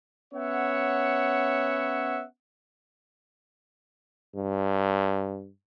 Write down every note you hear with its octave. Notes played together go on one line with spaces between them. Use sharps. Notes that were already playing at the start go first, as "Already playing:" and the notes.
B3 C#4 C#5 E5 F#5
G2